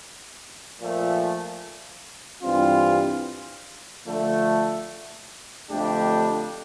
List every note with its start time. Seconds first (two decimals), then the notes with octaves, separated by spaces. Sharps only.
0.80 A#2 F3 A3
2.43 G2 E3 G3 C4 F4
4.07 D3 F3 A3
5.70 F2 D3 A3 D4 G4